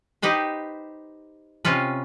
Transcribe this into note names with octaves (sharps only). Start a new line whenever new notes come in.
D#4 G4 B4 C5
C3 C#4 F4 B4